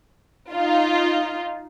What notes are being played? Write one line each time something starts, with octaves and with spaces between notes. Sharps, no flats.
D#4 F4